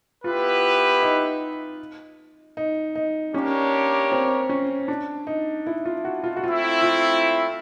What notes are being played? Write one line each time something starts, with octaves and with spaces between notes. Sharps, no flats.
B3 E4 F4 G4 B4
D#4
D#4
D#4
A#3 C#4 D4 G4 A#4 C#5
C4
C#4
D4
D#4
E4
F4
F#4
F4
F#4
A3 C4 E4 F4
F4